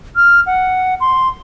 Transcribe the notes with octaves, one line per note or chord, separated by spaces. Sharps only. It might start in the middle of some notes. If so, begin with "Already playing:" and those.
F6
F#5
C6